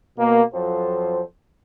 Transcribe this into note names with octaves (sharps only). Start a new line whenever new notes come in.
B2 A#3
F2 F#3 F4 A4 C5